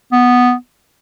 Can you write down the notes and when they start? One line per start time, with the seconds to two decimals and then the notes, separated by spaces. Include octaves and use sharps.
0.12 B3